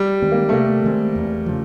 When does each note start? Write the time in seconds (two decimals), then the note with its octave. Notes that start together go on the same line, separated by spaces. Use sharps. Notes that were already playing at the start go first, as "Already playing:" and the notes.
Already playing: G3
0.22 D#3 G#3 C4
0.32 A#3
0.49 A3
0.52 C3 A#3
0.84 D#3 G#3 C4
1.15 E2
1.46 C#3 F3